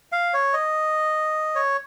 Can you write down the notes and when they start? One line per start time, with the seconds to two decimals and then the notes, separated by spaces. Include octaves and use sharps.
0.12 F5
0.34 C#5
0.53 D#5
1.55 C#5